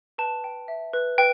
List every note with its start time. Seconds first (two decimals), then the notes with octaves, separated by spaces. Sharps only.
0.18 B4 A5
0.44 G5
0.68 E5
0.93 B4
1.18 B4 G5